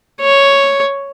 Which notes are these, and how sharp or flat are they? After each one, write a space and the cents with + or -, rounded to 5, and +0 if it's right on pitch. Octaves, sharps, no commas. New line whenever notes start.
C#5 +0